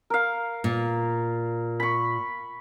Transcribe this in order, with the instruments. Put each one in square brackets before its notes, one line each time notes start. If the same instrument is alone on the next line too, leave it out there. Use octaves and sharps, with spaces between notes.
[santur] A#4 F5
[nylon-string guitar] A#2
[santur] B5 C#6